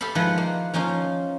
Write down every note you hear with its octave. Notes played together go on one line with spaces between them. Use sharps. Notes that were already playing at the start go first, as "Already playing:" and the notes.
G4 A4 E5 F5 B5
D#3 F3 G#3 E4 B4 F#5
A#3
F3 A#3 C#4 D#4 F4